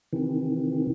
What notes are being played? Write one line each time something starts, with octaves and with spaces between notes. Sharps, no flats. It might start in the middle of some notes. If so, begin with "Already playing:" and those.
C3 D#3 E3